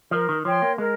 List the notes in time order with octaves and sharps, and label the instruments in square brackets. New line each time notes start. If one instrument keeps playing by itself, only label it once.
[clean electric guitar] F3 [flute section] A#4
[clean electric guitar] D#3
[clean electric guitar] F3 [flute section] C#5 G5 C6
[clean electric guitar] A#3
[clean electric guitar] G#3 [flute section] A#4